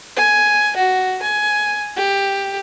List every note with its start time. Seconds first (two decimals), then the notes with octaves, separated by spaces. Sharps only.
0.16 G#5
0.76 F#4
1.22 G#5
1.96 G4